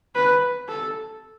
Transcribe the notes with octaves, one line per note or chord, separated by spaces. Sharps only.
B4
A4